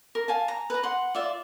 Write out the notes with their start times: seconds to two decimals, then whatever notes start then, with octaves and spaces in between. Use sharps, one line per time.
0.15 A#4
0.28 F5 G#5 A5
0.48 A#5
0.70 B4 A#5
0.83 F#5 C6
1.15 F4 D5 E5